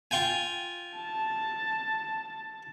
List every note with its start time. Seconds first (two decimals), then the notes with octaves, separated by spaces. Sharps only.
0.11 F4 G5 G#5
0.96 A5